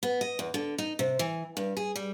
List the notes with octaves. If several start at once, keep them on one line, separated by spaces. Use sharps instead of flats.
B3
D#5
E2
D3
D#4
C3
E3
G2
G#4
G3